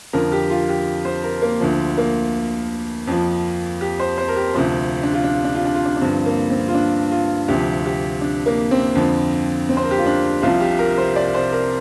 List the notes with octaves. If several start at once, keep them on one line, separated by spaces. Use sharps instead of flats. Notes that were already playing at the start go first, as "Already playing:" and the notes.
F2 D3 F3 A#4
G4
F4
G4
C5
A#4
A#3
D2 D3 F3
A#3
F2 F3
G4
C5
C5
A#4
G4
D2 C3 F3 C5
D4
F4
D4
F4
D4
F4
D4
F4
D4
D4
G2 D3 F3 C4
A#3
C4
F4
D4
F4
D2 C3 F3 G4
G4
D4
A#3
C4
F2 D3 F3
C4
C5
A#4
G4
F4
D4
C2 C3 F3 F4
G4
A#4
C5
D5
C5
A#4